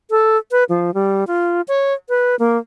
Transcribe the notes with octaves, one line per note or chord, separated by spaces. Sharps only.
A4
B4
F3
G3
F4
C#5
B4
A#3